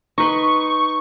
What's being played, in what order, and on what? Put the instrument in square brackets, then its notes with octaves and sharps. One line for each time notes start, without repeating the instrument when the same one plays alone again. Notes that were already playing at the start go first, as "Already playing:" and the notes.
[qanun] D#4 B4 C6 [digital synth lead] C#6